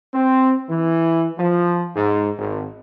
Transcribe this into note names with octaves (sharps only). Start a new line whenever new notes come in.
C4
E3
F3
G#2
G#1